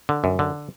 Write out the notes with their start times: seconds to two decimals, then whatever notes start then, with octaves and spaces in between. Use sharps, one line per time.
0.09 D3
0.24 F#2
0.39 D3